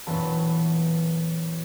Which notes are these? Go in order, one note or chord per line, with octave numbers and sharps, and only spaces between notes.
E1 F#2 A#2 E3 B3 A5